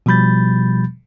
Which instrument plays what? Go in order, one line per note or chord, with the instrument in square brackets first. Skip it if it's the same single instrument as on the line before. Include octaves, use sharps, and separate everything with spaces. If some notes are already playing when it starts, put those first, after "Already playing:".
[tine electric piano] B2 F3 G3 B5 G6 A6